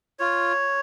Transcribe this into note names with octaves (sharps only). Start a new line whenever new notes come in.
F4 C#5